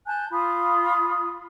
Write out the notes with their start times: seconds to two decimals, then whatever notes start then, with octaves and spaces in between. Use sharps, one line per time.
0.06 G#5 A5 F#6 G6
0.31 F4 B5 D#6